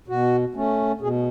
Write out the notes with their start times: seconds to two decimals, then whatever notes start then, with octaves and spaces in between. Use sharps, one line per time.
0.08 B2 F#4
0.55 A3 C#4
1.00 B2 G#4